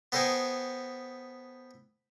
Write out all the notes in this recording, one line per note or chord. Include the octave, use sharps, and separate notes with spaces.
B3 A4 C5 D#5 G5 G#5